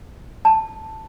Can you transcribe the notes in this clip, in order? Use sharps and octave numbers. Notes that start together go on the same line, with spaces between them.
A5